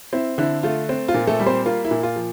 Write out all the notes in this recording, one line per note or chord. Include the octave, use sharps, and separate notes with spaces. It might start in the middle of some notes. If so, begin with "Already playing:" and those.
C4 E4
D3 E4
A3 F4
C4
F4
A#2
A3 A4
G3
C4 C5
A#3 F4
E4
A#2
F4
F3